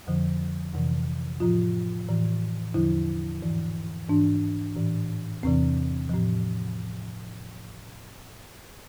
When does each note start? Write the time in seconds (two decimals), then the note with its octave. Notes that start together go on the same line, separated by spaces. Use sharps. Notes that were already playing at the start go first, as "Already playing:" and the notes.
0.07 F2 D3 F3
0.74 F2 C3 E3
1.40 A2 F3 F4
2.08 A2 E3
2.74 E2 D3 F3 E4
3.42 G#2 E3
4.09 G#2 E3 D4
4.75 A2 E3
5.43 E2 C3 E3 C4
6.09 A2 F3